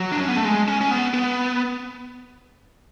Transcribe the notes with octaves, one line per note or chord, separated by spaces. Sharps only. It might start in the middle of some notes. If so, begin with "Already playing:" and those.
Already playing: F#3
D4
C#4
B3
A3
G#3
C#4
C#4
B3
B3